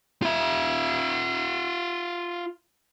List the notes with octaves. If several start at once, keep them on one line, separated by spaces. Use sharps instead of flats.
F4 E5